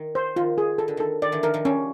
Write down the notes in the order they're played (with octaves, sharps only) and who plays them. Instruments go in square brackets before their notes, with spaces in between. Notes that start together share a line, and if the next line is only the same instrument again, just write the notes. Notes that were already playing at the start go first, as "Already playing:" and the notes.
Already playing: [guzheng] D#3
[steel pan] C5
[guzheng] D#3 [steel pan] F4
[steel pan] G#4
[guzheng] D#3 [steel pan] A4
[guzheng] D3
[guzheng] D#3 [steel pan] A4
[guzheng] D#3 [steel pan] D5
[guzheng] D3 E3
[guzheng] D#3 F3 [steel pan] A#4
[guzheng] D#3 F3
[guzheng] F3 G3 [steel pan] C#4